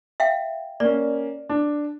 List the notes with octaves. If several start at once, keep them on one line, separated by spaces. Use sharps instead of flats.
E5 F5 G5
A#3 C#4 D5
D4